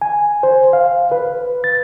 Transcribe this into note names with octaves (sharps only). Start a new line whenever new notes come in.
G#5
C5
F5
B4
A6